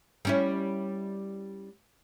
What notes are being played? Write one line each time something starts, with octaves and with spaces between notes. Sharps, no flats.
G3 C#4 E4